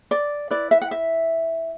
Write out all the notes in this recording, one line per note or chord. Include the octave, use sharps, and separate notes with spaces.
D5
E4 B4 D5
E5
F#5
E5